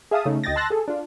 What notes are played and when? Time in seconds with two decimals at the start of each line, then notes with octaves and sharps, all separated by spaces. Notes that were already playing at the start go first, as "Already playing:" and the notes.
0.11 G#4 E5 F5 A5 D#6
0.26 C#3 A3 D#4
0.44 D2 D#5 G5 A6 A#6
0.56 A5 C6 E6 F#6 A6 A#6
0.70 G#4 A4
0.88 D4 F4